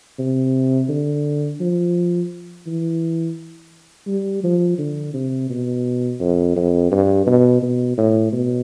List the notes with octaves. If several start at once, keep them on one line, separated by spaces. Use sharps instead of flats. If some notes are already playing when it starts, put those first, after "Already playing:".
C3
D3
F3
E3
G3
F3
D3
C3
B2
F2
F2
G2
B2
B2
A2
B2